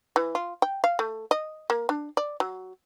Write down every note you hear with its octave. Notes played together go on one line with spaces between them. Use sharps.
E3
F4
G5
F5
A3
D#5
A#3
D4
D5
F#3